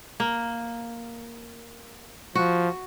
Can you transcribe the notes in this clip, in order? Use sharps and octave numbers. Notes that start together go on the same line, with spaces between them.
A#3
F3 F#4